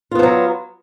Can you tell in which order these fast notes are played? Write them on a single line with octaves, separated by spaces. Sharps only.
F4 B3 F3 F#3